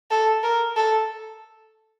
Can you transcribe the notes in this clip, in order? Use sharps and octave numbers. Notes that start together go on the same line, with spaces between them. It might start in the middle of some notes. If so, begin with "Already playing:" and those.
A4
A#4
A4